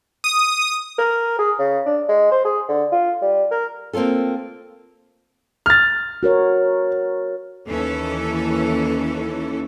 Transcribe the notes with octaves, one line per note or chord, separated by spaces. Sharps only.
D#6
A#4
G#4
C#3
D4
G#3
C5
G#4
D3
F4
G3
A#4
A#3 C4 C#4 F4 A4
F6 A6
F#4 A#4 C#5
D#2 E3 C#4 A4